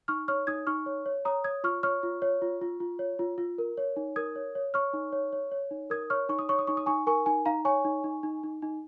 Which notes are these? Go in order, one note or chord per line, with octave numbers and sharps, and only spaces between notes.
D#4 C#6 F6
C#5 C#6 F6
D#4 D#6 G#6
D#4 C#6 F6
C#5
C#5
C#5 A#5 D#6
C#5 D#6 G#6
F4 C#6 F6
C#5 C#6 F6
F4
C#5
F4
F4
F4
C#5
F4
F4
A#4
C#5
D#4
A#4 D#6 G#6
C#5
C#5
C#5 C#6 F6
D#4
C#5
C#5
C#5
D#4
A#4 D#6 G#6
C#5 C#6 F6
D#4 C#6
D#6
C#5 C#6
D#6
D#4 C#6
D#6
D#4 G#5 C#6
A#4 G#5 C#6
D#4 G#5
D#4 F5 A#5
C#5 G#5 C#6
D#4
D#4
D#4
D#4
D#4